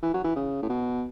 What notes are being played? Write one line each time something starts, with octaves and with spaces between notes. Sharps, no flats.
E3
F#3
E3
C#3
A2
B2